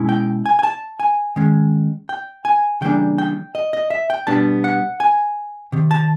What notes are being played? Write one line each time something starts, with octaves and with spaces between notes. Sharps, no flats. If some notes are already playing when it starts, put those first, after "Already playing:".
Already playing: B2 G#3 C#4 E4
G5
G#5
G#5
A5
G#5
D#3 G#3 C#4
G5
G#5
C#3 E3 G3 A#3 D4 G5
G5
D#5
D#5
E5
G5
B2 G3 B3 D4 A5
F#5
G#5
C3 D#3
A5